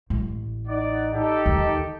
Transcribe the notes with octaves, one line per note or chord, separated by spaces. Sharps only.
A1
D#4 D5 F#5
D#4 G4 A4
D#2